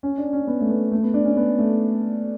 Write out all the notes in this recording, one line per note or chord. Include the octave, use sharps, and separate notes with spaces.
C#4
D4
C#4
B3
A3
B3
A3
B3
D4
C#4
B3
A3